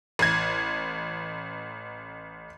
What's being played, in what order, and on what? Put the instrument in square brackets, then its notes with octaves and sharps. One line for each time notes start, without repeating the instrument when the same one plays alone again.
[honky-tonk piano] A1 G#6